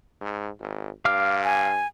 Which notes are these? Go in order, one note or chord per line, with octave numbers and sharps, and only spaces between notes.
G#2
G#1
G2 F5 D6 F6
G#5